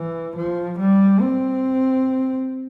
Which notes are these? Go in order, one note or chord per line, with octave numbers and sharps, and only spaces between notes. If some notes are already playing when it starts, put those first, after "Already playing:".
Already playing: E3
F3
G3
C4